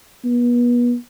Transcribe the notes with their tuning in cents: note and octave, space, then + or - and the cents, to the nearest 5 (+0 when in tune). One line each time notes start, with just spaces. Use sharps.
B3 -35